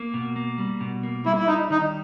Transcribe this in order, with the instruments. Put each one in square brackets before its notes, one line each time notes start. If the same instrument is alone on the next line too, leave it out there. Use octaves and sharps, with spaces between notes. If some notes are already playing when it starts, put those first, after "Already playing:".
Already playing: [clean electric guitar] A#3
B2
A#3
G3
B2
A#3
[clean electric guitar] G3 [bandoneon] E4
[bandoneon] E4
[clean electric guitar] G3 [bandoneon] D#4
[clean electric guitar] D#3 [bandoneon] D#4